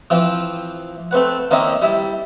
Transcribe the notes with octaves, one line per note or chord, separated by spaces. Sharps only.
E3 F3 C4 F4
A3 C4 B4 F#5
D#3 A#3 C4 C#4 D#4 E4
G3 E4 E5